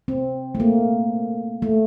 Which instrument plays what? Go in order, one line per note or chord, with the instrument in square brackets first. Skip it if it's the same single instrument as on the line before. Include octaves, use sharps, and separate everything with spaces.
[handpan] C4
A3
A#3
A3